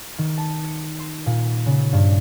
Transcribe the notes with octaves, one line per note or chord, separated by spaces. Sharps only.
D#3
A5
C#7
C6
A#2
C#3
G2